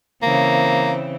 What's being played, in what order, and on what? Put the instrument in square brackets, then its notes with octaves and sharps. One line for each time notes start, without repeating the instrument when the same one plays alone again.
[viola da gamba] C#3 E3 C4 [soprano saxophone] A#3